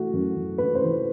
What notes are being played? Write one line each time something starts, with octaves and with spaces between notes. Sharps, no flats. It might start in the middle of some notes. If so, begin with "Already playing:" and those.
Already playing: E3 A3 F#4
F#2
F#2
A3 B4
C5
E3 B4